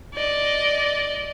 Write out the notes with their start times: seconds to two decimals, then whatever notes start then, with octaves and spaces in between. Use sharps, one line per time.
0.15 D5 D#5